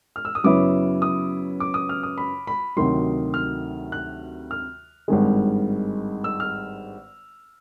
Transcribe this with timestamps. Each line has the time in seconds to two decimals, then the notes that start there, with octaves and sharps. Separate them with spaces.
0.16 F6
0.25 E6
0.35 D#6
0.44 F#2 C#3 F#3 B3 E4 D6
1.02 D#6
1.60 D6
1.74 D#6
1.89 F6
2.03 D#6
2.18 B5
2.47 B5
2.76 D2 C3 D#3 F#3 C6
3.34 F6
3.92 F#6
4.51 F6
5.08 G#1 G2 D#3 G#3
6.24 E6
6.40 F6